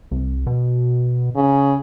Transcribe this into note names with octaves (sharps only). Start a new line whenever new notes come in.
C2
B2
C#3